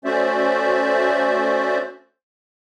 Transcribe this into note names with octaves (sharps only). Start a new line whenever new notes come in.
A3 C#4 F#4 C5 D5 E5